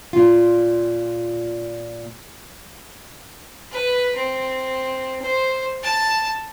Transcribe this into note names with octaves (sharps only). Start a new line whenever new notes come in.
A#2 F4
B4
C4
C5
A5